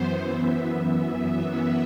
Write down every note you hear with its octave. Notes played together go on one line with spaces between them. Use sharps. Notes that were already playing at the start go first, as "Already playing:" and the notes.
Already playing: F#2 E3 B3 C5
E5
E5